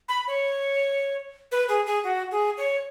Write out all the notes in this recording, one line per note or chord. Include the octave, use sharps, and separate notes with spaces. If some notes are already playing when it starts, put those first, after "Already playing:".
B5
C#5
B4
G#4
G#4
F#4
G#4
C#5